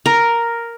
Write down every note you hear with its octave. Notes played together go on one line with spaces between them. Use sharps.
A#4